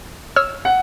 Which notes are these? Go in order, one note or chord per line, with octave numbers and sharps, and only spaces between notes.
C#5 E6 F6
F#5